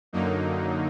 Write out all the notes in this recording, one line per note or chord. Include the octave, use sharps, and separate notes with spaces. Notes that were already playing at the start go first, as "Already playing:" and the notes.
F#2 D3 F#3 A#3 D#4